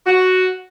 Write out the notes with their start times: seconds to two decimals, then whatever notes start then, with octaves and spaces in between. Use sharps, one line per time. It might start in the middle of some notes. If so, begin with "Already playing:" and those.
0.06 F#4